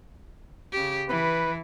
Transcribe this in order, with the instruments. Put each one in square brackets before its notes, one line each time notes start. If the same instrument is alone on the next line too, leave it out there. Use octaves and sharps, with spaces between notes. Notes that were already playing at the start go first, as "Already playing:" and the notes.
[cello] C#3 G4
[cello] E3 [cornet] B4